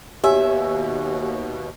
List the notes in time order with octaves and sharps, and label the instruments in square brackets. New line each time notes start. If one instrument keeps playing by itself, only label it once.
[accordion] D#2 B2 [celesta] G4 [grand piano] C#5 G#5 E6 [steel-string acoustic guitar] E5